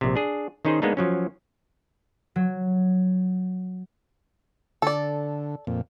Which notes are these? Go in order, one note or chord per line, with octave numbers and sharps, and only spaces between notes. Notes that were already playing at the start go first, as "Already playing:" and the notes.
A#1 C3
D4 G#4
D#3 C#4 D#4 G#4 C5
G#3 A#3 B3 D4 D#4
F3 F#3 C#4
F#3
D3 A4 D5
F2 A#2